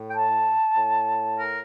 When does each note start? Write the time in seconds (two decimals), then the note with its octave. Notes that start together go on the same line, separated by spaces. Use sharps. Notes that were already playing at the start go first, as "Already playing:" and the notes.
Already playing: A2
0.11 G5
0.16 A5
0.76 A2
1.37 A#4